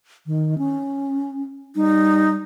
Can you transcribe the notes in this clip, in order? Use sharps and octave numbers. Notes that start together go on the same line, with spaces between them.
D#3
C#4
G3 D#4